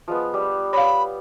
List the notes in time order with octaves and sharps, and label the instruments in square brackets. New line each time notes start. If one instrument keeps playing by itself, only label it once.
[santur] F3 G#3 B3
G3
[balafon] C#5 F5 [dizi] B5